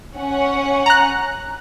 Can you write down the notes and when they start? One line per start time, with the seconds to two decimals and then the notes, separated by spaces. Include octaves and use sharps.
0.16 C#4 F#5
0.86 A#5 F#6